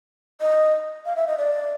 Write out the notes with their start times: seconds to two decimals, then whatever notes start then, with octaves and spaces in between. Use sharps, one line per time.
0.41 D#5
1.06 F5
1.16 E5
1.27 D#5
1.38 D5